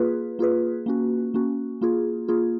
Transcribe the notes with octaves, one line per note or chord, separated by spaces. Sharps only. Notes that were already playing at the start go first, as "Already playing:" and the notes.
Already playing: A#3 F4 G#4 B4
A#3 F4 G#4 B4
A#3 C#4 F#4
A#3 C#4 F#4
A#3 F4 G#4
A#3 F4 G#4